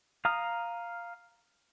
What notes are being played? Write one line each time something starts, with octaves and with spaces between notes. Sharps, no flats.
F5 A#5 D#6 F6